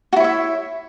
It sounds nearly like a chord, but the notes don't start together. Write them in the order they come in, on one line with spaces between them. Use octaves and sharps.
F#4 E4 C#5 E5